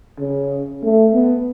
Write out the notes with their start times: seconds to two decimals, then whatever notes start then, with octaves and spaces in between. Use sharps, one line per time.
0.18 C#3
0.83 A3
1.14 B3